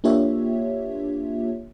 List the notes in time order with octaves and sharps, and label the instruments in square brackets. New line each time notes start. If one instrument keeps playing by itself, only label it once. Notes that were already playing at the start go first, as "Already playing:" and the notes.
[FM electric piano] A#3 D4 F4 G4 C#5 E5